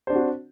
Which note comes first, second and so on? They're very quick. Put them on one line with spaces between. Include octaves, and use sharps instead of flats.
C5 D4 C4 F#4